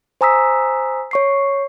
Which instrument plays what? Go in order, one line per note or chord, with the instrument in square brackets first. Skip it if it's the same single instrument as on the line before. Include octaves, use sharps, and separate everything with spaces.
[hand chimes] C5 G#5 A#5 D#6 E6 B6
C#5 C#6 C7